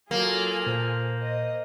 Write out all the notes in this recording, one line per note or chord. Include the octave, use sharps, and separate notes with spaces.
F#3 A#3 F4 G#4 A4
A#2 C5
D#5